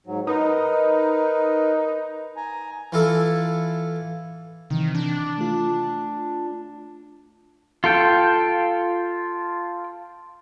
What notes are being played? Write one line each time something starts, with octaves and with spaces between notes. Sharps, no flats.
G#2 F#3
D#4 A#4 B4
G#5 A#5
E3 F4 A4
C3 D#3 E3
D4
A3 F4
F4 A4 G5